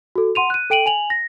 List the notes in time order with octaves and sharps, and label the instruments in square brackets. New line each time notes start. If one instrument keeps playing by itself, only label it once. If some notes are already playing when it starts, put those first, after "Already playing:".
[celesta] F#4 A4
F#5 C6 D#7 F7
F#6 D#7
A4 G5 D7 D#7 F#7
G#5 F7 F#7
A#6